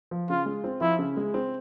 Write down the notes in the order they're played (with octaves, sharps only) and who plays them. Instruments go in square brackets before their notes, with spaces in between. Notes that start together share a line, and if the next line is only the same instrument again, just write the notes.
[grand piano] F3
[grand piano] C#3 [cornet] F4
[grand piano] G#3
C4
[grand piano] F3 [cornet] E4
[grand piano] C#3
G#3
C4